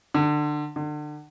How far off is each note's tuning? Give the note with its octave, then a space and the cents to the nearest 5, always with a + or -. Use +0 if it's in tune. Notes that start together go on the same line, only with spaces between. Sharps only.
D3 +25
D3 +35